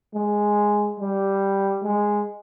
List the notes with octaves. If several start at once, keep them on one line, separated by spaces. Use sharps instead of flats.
G#3
G3
G#3